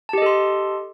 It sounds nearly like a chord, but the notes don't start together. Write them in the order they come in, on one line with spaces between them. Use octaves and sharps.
A5 G4 D#5 A4 C6